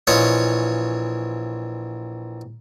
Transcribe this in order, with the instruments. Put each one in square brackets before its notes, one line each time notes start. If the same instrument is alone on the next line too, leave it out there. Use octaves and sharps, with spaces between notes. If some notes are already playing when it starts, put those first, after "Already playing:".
[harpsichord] A#1 E3 F4 C#5 D#5